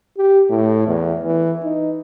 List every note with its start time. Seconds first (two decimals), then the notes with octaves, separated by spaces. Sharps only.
0.18 G4
0.50 A2
0.87 E2
1.24 E3
1.63 D#4